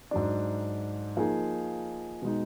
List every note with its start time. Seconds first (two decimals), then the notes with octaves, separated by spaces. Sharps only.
0.11 G#2 F#3 D4
1.17 F3 A#3 D#4 G#4
2.22 B2 G#3 D#4